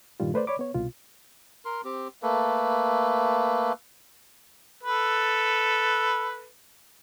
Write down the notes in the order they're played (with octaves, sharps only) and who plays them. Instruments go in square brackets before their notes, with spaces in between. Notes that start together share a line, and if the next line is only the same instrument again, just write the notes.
[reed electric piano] G2 A#2 D#3 G3 F4
A3 B4 C5 D5
C#5 D5 B5 D6
B3 C#5
C2 B2 F4
[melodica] A#4 C6
C4 G4
A3 A#3 A4 B4
[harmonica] A4 B4